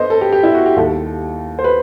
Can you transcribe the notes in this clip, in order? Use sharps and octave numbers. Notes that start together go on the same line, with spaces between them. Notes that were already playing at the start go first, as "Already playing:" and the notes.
Already playing: G2 A4 B4 C5 D#5
A4
G4
G4
E4
F#4
G4
D#2 D#3 G3 A4
C5
B4